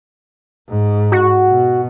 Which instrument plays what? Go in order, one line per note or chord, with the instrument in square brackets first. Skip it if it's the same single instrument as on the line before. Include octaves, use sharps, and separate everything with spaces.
[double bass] G#2
[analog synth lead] F#4
[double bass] B2